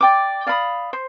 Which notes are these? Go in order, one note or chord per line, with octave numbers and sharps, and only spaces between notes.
D5 G5 D6
D5 F5 B5 D#6
C5